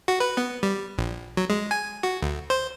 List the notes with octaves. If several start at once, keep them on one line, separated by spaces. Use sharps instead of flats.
F#4
B4
B3
G3
A#1
F#3
G#3
G#5
F#4
D2
C5